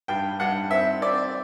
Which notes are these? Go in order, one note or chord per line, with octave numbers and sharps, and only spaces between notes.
G2 G5
G2 F#5
C4 E5
C4 D5